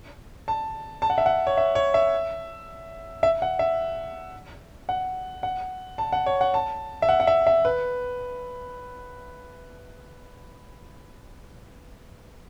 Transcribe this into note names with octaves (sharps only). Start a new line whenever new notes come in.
A5
A5
F#5
E5
F#5
C#5
E5
C#5
E5
E5
F#5
E5
F#5
F#5
A5
F#5
C#5
F#5
A5
E5
F#5
F#5
E5
E5
B4